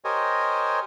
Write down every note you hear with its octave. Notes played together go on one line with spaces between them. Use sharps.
G4 A#4 C5 C#5 D#5 G#5